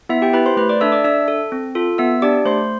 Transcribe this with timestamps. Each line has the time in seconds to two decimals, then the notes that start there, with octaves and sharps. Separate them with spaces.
0.09 B3 E4 E5
0.22 G4 G5
0.33 E4 G4 B4 B5
0.46 C5 C6
0.57 A3 B4 B5
0.69 D5 D6
0.81 D4 A4 E5 E6
0.92 D5 D6
1.04 D4 E5 E6
1.28 A4
1.52 C4
1.75 F4 A4
1.98 B3 E5 E6
2.22 D4 G4 D5 D6
2.45 A3 C5 C6